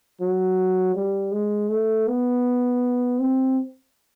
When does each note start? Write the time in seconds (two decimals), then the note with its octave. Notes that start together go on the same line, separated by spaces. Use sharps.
0.21 F#3
0.95 G3
1.32 G#3
1.70 A3
2.07 B3
3.19 C4